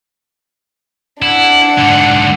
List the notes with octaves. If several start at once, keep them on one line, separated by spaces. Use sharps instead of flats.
D4 E4 F#5
G#2 D3